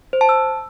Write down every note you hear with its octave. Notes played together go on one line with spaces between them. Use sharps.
C5
A5
E6